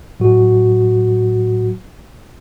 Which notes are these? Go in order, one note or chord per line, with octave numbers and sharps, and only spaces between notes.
A2 F#3 F#4